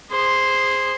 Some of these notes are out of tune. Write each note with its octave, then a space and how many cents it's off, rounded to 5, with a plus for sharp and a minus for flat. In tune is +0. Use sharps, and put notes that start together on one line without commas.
G#4 -20 C5 +0